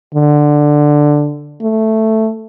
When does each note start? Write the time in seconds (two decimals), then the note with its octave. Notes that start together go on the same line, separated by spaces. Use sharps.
0.14 D3
1.62 A3